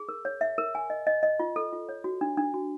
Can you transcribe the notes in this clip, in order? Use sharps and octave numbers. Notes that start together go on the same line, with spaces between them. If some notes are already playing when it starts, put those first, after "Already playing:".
Already playing: G#4
A#4
C#5
E5
A#4
G#5
D#5
D#5
D#5
F4
A4
F4
C#5
F#4
D4
D4
F#4